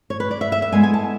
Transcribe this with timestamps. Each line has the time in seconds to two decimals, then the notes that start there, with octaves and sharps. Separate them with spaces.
0.10 C#5
0.20 B4
0.31 D5
0.41 E5
0.52 E5
0.62 E5
0.72 A2 G#3 B3 G#5
0.83 G#5
0.93 A5